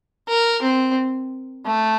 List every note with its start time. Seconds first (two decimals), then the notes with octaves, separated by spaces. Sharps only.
0.28 A#4
0.62 C4
1.66 A3